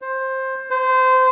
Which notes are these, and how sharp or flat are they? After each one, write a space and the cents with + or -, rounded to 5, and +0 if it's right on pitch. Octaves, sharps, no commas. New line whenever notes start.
C5 +15
C5 -20